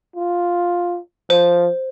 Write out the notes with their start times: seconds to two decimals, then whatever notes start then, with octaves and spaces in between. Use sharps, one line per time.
0.16 F4
1.30 F3 C5